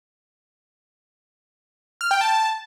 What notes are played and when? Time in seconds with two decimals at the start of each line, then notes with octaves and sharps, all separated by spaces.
2.01 F6
2.11 G5
2.21 A5